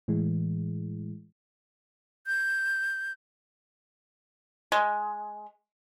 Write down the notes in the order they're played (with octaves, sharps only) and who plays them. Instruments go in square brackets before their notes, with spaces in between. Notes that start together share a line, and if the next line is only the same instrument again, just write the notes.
[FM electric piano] A2 E3 G#3
[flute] G6
[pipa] G#3